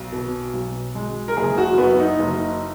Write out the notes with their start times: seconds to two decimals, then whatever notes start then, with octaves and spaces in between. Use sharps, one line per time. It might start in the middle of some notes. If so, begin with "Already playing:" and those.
Already playing: B1
0.12 B2
0.53 B1
0.95 G#3
1.28 A#4
1.37 F#1 G#4
1.58 F#4
1.78 F#2 B3
2.00 D#4
2.20 F#1